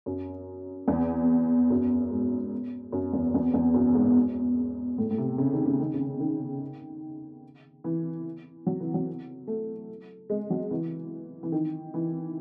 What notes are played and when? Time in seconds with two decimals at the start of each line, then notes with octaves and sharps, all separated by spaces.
0.06 F#2
0.88 E2
1.70 F#2
2.10 G#2
2.92 F#2
3.13 E2
3.34 E2
3.54 E2
3.74 F#2
3.95 G#2
4.98 A2
5.11 A2
5.18 C3
5.38 C#3
5.53 D#3
5.66 C#3
5.80 D#3
5.94 C#3
6.20 D#3
7.84 E3
8.67 F#3
8.80 E3
8.94 F#3
9.47 A3
10.30 G#3
10.50 F#3
10.71 E3
11.43 E3
11.52 D#3
11.94 E3